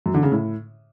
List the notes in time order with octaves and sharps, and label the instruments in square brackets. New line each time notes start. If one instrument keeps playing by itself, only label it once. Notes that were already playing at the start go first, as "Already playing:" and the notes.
[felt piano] F#2
D3
C#3
A2